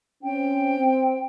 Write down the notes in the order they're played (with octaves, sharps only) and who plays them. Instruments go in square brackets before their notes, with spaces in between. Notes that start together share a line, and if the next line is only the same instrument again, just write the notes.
[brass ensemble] C4 C#4 [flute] G5
[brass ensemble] C4